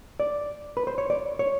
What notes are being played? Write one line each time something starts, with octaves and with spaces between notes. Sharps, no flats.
D5
B4
C5
C#5
D5
C#5